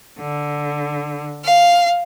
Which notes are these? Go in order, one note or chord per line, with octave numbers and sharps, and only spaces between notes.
D3
F5